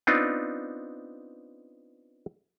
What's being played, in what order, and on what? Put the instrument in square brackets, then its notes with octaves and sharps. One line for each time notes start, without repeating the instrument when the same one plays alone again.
[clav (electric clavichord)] B3 C4 D4 D#4 F4